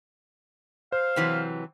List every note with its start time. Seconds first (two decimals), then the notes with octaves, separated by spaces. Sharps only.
0.92 C5 F5
1.16 C3 E3 F#3